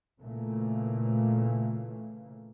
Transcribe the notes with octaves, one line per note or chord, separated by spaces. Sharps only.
A#2 C#3 E3 A3 A#3